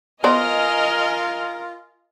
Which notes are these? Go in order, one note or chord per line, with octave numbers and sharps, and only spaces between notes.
B3 F4 A#4 C5 D5 D#5 G#5 F6